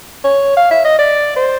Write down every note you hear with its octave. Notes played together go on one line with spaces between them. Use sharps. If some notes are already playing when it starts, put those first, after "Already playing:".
C#5
F5
E5
D#5
D5
C5